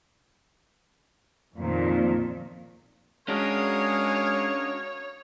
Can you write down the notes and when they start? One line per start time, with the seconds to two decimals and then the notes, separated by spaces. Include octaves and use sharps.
1.56 F2 A#2 D#3
3.28 G#3 C#4 D4 F#4 A#4 C#5 F5 D#6